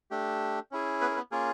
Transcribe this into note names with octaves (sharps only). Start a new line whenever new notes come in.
A3 D4 G4
C#4 E4 G#4
B3 B4
A#4
B3 B4
A#3 C#4 F4 G#4 A#4